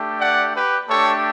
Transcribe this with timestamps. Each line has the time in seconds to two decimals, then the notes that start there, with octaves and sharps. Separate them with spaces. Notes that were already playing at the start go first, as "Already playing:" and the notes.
Already playing: A3 D4 G4
0.20 D5 F#5
0.54 G4 B4
0.88 A3 D4 G4 A4 C#5